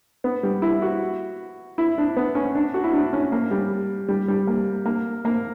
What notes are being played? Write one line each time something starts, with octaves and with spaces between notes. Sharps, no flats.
B3
G3
E4
F#4
E4
D4
B3
C#4
D4
F#4
E4
D4
C#4
A#3
G3
G3
G3
A#3
A#3
A#3